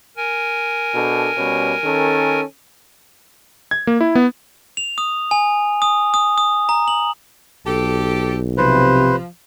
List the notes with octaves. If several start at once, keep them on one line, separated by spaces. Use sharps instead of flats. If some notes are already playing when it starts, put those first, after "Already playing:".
A#4 G#5
B2 D4 A4
B2 G3 C#4
D#3 C#4 A4
G#6
A#3
E4
B3
F7
D#6
G#5
D#6
D#6
D#6
A#5
F#7
B1 G4 A4
C3 F3 B4 C5